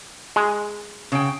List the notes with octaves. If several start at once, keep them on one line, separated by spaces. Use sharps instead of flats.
G#3
C#3 G5